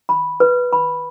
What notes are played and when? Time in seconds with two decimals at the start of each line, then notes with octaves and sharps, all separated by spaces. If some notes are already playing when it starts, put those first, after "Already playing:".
0.09 B5
0.40 B4
0.73 B5